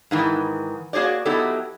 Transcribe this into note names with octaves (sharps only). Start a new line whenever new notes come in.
G#2 D#3 E3
A#3 F#4 G#4 C#5 D5
F#3 B3 D#4 E4 G4 A4